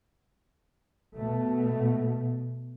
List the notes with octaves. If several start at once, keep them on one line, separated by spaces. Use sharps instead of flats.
B2 A3